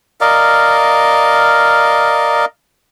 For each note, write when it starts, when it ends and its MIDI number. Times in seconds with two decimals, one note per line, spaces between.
0.21 2.45 70
0.21 2.45 74
0.21 2.45 75
0.21 2.45 77